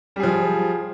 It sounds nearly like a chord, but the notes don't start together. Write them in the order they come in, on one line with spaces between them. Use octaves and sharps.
G3 G#4 F3